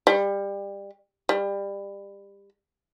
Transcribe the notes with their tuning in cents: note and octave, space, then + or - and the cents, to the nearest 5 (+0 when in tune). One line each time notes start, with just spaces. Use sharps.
G3 +25
G3 +25